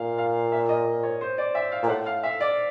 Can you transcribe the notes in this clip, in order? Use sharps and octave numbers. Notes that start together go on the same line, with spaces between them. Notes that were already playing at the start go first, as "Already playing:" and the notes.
Already playing: A#2 F5
F5
E5
D#5
C#5
C5
D5
E5
F5
A#2
A2 F#5
F5
E5
D5